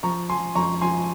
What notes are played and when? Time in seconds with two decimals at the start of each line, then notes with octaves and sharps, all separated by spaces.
0.03 F3 A#5 C#6
0.30 F3 G#5 C6
0.55 F2 A#5 C#6
0.81 F3 G#5 C6